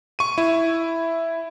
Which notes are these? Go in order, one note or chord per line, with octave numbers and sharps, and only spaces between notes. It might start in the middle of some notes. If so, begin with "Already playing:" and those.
C#6 D#7
E4